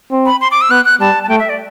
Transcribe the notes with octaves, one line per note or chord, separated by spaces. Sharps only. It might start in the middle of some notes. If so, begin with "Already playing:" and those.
C4
B5
C6
D6
E6
B3 F#6
F#6
G3 A5
A5
A3 G5
E5
D5